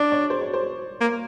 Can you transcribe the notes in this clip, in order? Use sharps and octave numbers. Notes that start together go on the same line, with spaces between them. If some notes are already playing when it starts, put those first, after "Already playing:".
Already playing: D4 D5
C#5
C5
C#5
C5
A#3